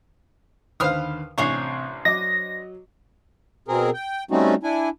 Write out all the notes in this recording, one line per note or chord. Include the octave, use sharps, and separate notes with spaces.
D#2 D3 B4 C5 F5 D#6 F6
A1 C3 D4 C5 C#5 G#5 C7
F#3 D#5 D6 A#6
B2 C4 G#4 A#4
G5
G3 A3 C4 C#4 D#4 F#4
D4 E4 G#5